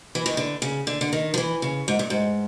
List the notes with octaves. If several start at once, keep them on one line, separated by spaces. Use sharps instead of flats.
E3
D#3
D3
C#3
D3
D3
D#3
F3
E3
C#3
G#2
G2
G#2